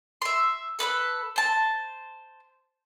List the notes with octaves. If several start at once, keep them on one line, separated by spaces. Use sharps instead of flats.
E5 C6
A4 B4 E5 B5
C5 A5